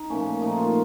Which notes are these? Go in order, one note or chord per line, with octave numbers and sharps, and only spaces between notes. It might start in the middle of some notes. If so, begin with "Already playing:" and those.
Already playing: D#4
A#2 F3 A3 C#4
A#2 F3 A3 D#4
F4